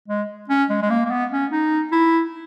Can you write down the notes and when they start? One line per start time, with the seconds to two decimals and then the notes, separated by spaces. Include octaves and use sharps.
0.08 G#3
0.49 C#4
0.70 G#3
0.82 G#3
0.90 A#3
1.05 A#3
1.11 B3
1.32 C#4
1.51 D#4
1.92 E4